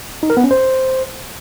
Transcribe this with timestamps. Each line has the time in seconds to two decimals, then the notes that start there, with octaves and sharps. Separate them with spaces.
0.23 D#4
0.30 A#4
0.37 B3
0.44 C#4
0.51 C5